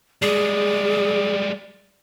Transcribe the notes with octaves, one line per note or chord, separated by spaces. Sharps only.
G3 G#3 G#4 D5